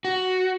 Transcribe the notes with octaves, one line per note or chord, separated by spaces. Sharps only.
F#4